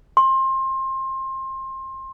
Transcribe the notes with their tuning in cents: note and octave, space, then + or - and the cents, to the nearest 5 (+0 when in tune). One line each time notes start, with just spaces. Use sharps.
C6 +25